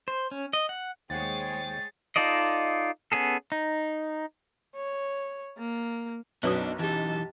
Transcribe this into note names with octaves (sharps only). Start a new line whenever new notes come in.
C5
C#4
D#5
F#5
D#2 G#3 G#4 C5 C#5 F#5 G5 A6
D#4 F4 A4 D5 D#5
B3 C#4 G#4 A4
D#4
C#5
A#3
B1 F#2 B3 D4 D#4 F#4 B4 C#5
E3 D#4 G4 A5